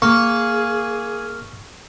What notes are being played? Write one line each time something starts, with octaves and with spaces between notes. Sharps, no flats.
A#3 G#4 C#6